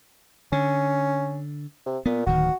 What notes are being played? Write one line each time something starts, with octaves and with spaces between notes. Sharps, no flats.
D3 C#4
C3
A#2 B3
D1 D#3 F#4